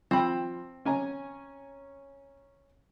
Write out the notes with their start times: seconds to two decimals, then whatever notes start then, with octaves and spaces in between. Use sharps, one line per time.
0.11 F3 C4 B5
0.85 C#4 G#5 A#5